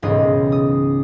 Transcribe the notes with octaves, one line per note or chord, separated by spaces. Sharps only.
E1 C#2 G#2 D#5 D#6
D#6